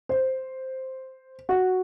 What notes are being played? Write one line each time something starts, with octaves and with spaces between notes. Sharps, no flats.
C5
F#4